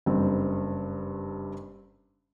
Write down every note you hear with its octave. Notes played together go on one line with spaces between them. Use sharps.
F#1 G2 C4